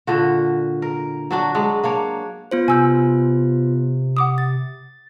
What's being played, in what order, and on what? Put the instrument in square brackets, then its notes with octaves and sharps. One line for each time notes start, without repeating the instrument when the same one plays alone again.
[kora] A#2 D3 F#4
A#4
F#3 D4 F#4
F#3 G#3 D4
A#3 D4 C#5
[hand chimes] B3 F4 C5
[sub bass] C3 [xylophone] G#5 E6 G6
[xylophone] F#5 D6 D#6
[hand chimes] A6